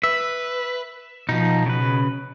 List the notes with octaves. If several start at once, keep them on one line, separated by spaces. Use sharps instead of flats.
B4 E5
B2 F3 D#4
C#3 B4